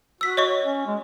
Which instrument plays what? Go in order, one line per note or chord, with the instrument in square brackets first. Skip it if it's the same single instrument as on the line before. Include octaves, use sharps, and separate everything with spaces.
[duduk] F#4 [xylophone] E6 B6
[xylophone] C#5 D#5 C#6
[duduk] C#4
G#3